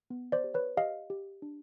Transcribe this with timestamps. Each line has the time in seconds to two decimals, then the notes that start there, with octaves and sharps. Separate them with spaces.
0.10 B3
0.32 C5 D5
0.44 G4
0.54 B4 C#5
0.77 G4 D#5 F5
1.10 G4
1.42 D4